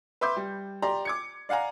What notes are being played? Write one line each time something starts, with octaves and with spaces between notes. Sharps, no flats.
B4 E5 C6 D6 G6
G3
G4 D5 A#5 C6
D6 G#6 C#7
D5 F5 F#5 G#5 A#5